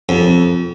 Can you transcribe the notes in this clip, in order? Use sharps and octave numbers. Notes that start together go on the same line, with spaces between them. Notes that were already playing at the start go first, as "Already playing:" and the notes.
F2